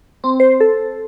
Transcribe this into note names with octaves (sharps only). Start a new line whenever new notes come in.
C4
C5
A4